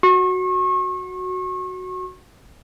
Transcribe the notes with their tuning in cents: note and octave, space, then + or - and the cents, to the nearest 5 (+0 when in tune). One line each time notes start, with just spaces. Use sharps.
F#4 +0 C#6 -35